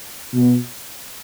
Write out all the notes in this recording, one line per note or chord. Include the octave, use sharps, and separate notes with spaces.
B2